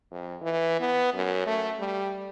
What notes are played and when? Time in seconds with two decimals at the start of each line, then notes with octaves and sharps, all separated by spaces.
0.11 F2
0.42 E3
0.80 B3
1.14 F#2
1.47 A3
1.79 G3